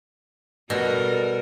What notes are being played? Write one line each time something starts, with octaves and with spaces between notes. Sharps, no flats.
B2 G3 A4 A#4